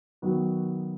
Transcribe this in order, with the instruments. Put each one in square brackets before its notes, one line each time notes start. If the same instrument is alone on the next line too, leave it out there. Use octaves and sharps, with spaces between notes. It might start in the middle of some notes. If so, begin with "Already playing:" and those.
[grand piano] D#3 F#3 B3 F#4